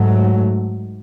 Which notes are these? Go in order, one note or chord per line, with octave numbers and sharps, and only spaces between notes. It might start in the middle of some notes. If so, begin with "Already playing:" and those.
Already playing: G#2 F#3 A3